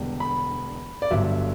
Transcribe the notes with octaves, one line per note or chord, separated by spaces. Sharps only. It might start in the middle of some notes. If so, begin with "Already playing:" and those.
Already playing: E1 E2 D3 G3
B5
D5
G1 G2 D3 F#3 E5